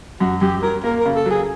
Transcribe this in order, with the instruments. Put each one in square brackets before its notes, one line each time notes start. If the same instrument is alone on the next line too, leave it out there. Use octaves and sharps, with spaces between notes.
[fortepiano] F#2 [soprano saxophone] F#4
[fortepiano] F#2 [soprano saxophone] G4
[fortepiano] F#3 [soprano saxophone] A#4
[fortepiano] A#3 [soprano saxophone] A#4
[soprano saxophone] A#4
[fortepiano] C#3
[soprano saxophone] A4
[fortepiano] F#3
[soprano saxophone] G#4